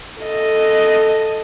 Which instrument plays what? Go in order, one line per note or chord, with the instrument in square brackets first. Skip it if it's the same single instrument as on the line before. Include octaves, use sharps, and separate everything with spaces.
[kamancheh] A4 D#5